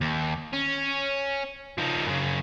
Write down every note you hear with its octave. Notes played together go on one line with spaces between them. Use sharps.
D#2
C#4
F3 D#4
F#2 C#3